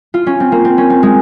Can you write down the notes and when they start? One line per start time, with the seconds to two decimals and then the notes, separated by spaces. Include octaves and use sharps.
0.14 F4
0.27 C#4
0.40 C4
0.52 A#3
0.65 C4
0.78 C#4
0.90 C4
1.03 G#3